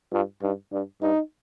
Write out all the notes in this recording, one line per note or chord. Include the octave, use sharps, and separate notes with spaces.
G2 F4
G2 D#4
G2 D4
G2 D#4